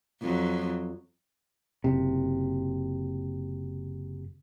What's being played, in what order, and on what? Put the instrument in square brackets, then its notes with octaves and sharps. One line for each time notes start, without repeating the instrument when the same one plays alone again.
[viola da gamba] F2 F#3
[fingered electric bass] F#1 C3